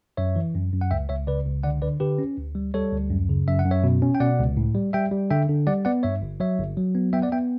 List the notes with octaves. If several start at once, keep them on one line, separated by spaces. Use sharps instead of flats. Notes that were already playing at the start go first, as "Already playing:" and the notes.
F#2 C#5 E5
E3
F#2
F#2
F#5
C#2 E5 G5
C#2 C#5 E5
C#3 B4 D5
C#2
D3 D5 F#5
D3 B4 D5
D3 G4 B4
C#4
D2
G3
G3 A4 C#5
D2
F#2
C#3
F#2 E5
F#5
F#2
C#5 E5
B2
C#4
G5
B2 D5 F#5
C#2
A2
G3
G3 E5 G5
G3
D3 E5 G5
D3
G3 D5 F#5
B3 D5 F#5
G2 C#5 E5
G1
F#3 C#5 E5
G1
F#3
B3
B3 E5 G5
D5 F#5
B3 E5 G5